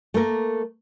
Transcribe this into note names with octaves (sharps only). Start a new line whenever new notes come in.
A3 A#3 A#4